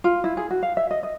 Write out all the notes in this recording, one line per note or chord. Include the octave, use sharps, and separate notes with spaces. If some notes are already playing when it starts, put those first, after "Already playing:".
F4
E4
G#4
F#4
F5
E5
D#5
D#5